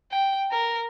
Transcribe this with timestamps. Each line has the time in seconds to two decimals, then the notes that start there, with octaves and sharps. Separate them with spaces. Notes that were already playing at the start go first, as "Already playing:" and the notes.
0.11 G5
0.51 A#4